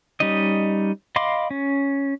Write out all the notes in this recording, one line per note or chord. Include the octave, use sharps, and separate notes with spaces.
G3 C#4 D#4 D#5
D#5 F5 B5 C6 D6
C#4